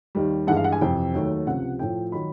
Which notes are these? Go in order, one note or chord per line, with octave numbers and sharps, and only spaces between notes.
D#2 D#3 G3
G2 E3 G#3 F#5
F5
F#5
G#5
F2 C3 E3 G5
D#2 D#3 F#3 A3
C#2 C3 F3 F#5
A2 F3 A3 G5
D#3 F#3 B5